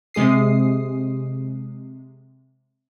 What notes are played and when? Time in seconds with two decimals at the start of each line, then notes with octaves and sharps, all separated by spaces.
0.14 C3 G#3 G#4 D#6 C7